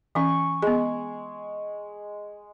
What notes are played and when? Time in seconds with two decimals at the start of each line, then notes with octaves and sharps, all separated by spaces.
0.15 E3 C#4 G#5 C#6
0.62 G#3 B3 G#4